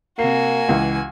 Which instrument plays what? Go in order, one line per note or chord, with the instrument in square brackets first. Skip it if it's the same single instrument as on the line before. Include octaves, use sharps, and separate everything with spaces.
[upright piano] C3 C7 [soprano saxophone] A#3 [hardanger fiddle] F#4 G#5
[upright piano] C#2 E3